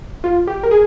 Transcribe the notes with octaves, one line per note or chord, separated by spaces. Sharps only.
F4
G4
A#4
G#4